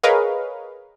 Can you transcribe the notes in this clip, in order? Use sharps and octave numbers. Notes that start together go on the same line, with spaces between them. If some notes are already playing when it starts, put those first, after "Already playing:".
G#4 A#4 B4 C#5 D#5 F5